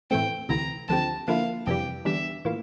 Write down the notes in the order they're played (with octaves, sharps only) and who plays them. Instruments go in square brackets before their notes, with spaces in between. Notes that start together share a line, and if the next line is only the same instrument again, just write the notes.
[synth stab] A2 E3 A3 C4 [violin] G5
[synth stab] D2 C3 E3 [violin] A#5
[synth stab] D2 D3 F3 C4 G4 [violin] A5
[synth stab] D3 F3 A#3 E4 [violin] F5
[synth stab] F2 C3 E3 G3 [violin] G5
[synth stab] E2 D3 G3 D4 [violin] E5
[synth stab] A2 E3 A#3 F4